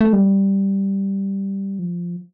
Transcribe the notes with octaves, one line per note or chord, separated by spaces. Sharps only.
A3
G3
F3